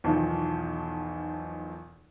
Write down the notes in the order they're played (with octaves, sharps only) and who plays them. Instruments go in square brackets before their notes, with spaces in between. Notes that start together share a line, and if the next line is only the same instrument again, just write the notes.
[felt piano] B1 E2 D#3 F3